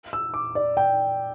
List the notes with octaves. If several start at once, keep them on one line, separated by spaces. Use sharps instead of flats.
E6
D6
D5
G5